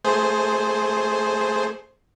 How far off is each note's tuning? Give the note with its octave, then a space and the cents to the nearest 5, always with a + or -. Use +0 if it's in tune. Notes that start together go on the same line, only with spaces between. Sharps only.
A3 +10 G#4 +10 C5 +0